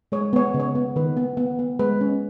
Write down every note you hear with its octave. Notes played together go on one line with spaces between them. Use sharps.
G#3 C#5
B3 C#5
C#3
C#5
B3
D#3 B4
B3
B3
B3
G#3 B4
C#4